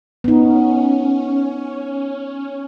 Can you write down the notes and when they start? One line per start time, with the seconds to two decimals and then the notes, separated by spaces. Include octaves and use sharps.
0.24 B3 C#4 D#4